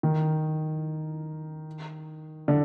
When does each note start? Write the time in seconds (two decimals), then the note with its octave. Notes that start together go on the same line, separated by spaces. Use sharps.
0.03 D#3
2.48 D3